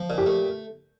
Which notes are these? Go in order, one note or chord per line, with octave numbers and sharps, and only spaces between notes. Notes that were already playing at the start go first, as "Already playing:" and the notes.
Already playing: F3
A#2
G4
A3